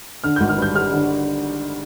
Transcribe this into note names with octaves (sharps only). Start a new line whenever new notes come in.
D3 F6
G#1 G6
F6
G2 G6
G3 F6
D3